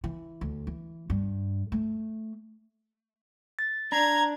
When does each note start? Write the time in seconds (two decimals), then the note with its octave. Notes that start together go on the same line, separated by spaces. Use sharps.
0.04 E3
0.41 D2
0.67 E3
1.10 G2
1.72 A3
3.59 A6
3.92 D4 A#5 G#6